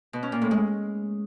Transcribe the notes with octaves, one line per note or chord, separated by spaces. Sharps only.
B2
C#4
A#2
A2
G#3